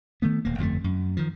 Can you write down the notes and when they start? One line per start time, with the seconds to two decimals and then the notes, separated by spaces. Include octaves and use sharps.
0.22 D#3 A3 B3
0.45 D#1 A#3
0.58 G1 F2 C#3 A3
0.84 F#2
1.17 D#3 F3